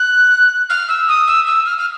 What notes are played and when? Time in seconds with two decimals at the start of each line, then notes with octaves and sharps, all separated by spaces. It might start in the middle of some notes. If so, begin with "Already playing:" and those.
Already playing: F#6
0.69 F6
0.88 E6
1.08 D#6
1.27 E6
1.46 E6
1.65 F6
1.78 F6